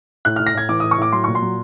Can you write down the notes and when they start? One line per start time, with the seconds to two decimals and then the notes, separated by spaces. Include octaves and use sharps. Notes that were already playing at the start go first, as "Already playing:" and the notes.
0.25 A2 F#6
0.36 A2 F6
0.47 A#6
0.54 A2 G#6
0.69 E3 D6
0.80 A2 D#6
0.91 C#6
0.98 A2 D6
1.12 F#3 C6
1.24 A#2 C#6
1.35 C6
1.42 F#3